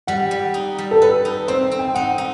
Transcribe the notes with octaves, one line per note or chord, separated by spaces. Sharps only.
G3 F#5
G3
D#4
G3
A4
A4 B4
D#4
C4 C5
C4
G5
D#4 F#5
D#4